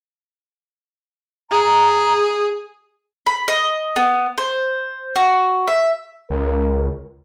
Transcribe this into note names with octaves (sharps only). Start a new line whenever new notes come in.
G#4 A#5
B5
D#5
B3
C5
F#4
E5
C#2 A#4